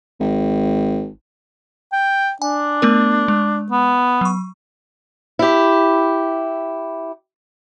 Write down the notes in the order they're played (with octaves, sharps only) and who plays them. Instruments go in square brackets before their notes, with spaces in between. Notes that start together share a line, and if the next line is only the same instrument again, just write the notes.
[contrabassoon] G#1
[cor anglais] G5
[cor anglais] D4 [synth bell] G#5
[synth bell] A3 B3 A#4
G#3
[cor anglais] B3
[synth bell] F#3 C#6
[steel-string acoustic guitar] E4 G4